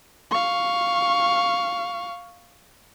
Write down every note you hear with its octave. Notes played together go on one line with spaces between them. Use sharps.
F5 C#6